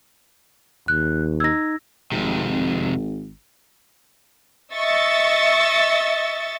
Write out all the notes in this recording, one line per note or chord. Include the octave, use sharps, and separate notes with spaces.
D#2 F#6
D#4 E6 G#6 A#6
G#1 F2 C3
D#5 E5 C#6 E6 A6